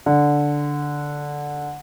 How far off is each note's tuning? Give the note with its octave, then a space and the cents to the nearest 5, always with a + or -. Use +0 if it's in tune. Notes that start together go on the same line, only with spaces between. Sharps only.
D3 -5